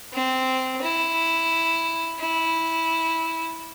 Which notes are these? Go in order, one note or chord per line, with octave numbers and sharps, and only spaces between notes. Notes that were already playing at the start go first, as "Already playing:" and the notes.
C4
E4
E4